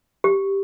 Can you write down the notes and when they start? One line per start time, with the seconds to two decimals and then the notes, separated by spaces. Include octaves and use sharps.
0.24 G4